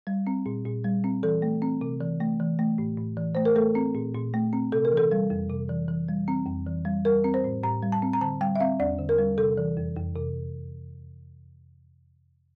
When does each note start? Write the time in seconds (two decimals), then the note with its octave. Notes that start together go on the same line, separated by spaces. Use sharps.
0.07 G3
0.27 C4
0.46 A#2
0.65 A#2
0.84 G3
1.04 C4
1.23 E3 A4
1.42 A3
1.62 C4
1.81 C3
2.01 E3
2.20 A3
2.40 E3
2.59 A3
2.78 A2
2.98 A2
3.17 E3
3.35 A3 C5
3.45 A#4
3.56 A3 A4
3.75 C4
3.95 A#2
4.14 A#2
4.34 A3
4.53 C4
4.72 C3 A4
4.85 A#4
4.92 E3
4.97 A4
5.11 G3
5.30 F2
5.50 C3
5.69 E3
5.88 E3
6.09 G3
6.28 C4
6.46 F2
6.66 E3
6.85 G3
7.05 G3 A#4
7.24 C4
7.34 C5
7.44 A2
7.63 A2 A#5
7.83 G3
7.92 A5
8.02 C4
8.13 A#5
8.21 D3 A5
8.41 G3 G5
8.56 E5
8.60 C4 F5
8.80 E2 D5
8.99 D3
9.09 A#4
9.18 G3
9.38 C3 A4
9.58 E3
9.77 F2
9.96 F2
10.16 C3